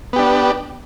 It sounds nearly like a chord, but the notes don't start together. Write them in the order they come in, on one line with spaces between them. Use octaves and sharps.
B3 G4 D4